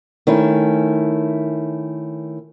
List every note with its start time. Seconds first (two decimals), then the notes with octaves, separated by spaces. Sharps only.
0.27 D#3 A3 C#4 E4